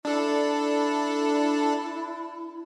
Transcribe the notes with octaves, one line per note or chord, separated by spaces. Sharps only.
D4 E4 A4